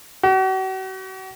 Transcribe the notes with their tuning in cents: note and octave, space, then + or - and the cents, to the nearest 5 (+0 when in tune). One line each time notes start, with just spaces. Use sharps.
F#4 +40